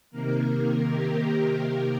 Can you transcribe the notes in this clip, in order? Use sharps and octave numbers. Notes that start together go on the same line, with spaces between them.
C3 D#3 A#3 A#4
G4